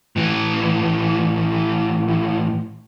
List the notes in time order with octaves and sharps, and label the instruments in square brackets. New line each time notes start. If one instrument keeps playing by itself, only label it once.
[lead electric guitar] A2 E3